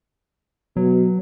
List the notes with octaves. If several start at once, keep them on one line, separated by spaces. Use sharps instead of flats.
B2 F#3